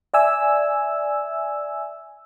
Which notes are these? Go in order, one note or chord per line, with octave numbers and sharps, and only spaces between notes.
D5 E5 G#5 E6